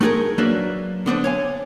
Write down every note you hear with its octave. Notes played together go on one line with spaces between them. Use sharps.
A3 D#4 F4 G#4 A#4
F#3 A#3 D4 B4 D5 E5
D3 B3 D4 C5
C#5 F5 G#5